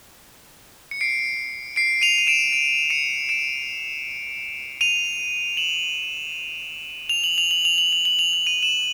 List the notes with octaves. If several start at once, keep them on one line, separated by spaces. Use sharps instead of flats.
C#7
C7 D7
C7 D7
D#7 F7
D#7
D7 E7
C7 D7
C#7 D#7
D7 E7
D#7 F7
E7 F#7
F7
F#7
F7
F#7
F7
F#7
F7
F#7
F7
F#7
D#7 F7
E7 F#7